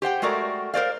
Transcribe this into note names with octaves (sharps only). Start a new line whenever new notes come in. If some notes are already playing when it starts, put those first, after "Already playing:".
G4 C5 F#5 G5
G#3 A3 F#4 A#4 D5
A#4 C5 D5 F5